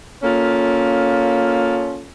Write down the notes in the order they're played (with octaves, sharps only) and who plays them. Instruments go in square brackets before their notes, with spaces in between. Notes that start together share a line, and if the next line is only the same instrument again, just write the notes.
[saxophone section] A#3 C#4 F4 A4